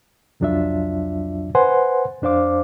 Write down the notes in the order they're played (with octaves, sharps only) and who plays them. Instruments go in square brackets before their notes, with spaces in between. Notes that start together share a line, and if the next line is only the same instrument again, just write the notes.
[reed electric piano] C2 F2 F#3 D4 F4 E5
B4 C5 F#5 G#5 C6
F2 D4 C5 F5 D6